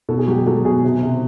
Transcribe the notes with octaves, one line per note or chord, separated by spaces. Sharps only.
B2 A4
G#4
F#3 G4
G#4
F#3 A4
B2 G#4
C3
C3